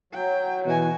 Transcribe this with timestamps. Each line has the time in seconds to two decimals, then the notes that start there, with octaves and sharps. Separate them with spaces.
0.13 F#3 G5
0.65 B2 E3 F#4 G#5